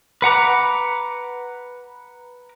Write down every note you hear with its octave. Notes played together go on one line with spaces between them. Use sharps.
B4 F#5 A#5 D6